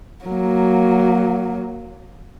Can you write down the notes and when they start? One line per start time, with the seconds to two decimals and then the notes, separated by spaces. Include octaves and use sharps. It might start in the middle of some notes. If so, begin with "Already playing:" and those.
0.25 F#3 A#3